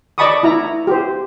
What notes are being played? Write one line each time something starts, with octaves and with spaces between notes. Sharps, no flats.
D5 D#5 A5 B5 C#6 D#6
E4 A#5
G4 C5